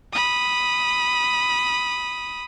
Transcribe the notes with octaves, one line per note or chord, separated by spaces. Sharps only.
B5 D#6